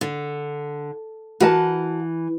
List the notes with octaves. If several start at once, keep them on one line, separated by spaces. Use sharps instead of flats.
D3
E3 F#4 A#4 A5